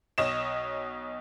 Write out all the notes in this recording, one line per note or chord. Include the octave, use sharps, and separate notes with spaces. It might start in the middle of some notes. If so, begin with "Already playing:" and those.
B1 C#5 D#5 E7